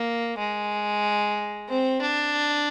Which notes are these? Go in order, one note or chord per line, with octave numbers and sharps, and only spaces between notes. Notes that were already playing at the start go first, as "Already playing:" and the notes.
Already playing: A#3
G#3
C4
D4